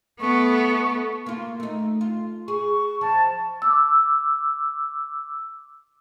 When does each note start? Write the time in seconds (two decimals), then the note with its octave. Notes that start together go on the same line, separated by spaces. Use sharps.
0.20 A3 B3 C#6
0.72 A3
1.26 A#3 F4
1.60 A3 D#4
2.01 F4
2.48 G#4 C#6
3.01 F3 A5
3.62 D6 E6